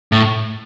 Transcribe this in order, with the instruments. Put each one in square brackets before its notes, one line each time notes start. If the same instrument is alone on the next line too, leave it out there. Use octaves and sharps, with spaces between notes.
[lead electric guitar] A2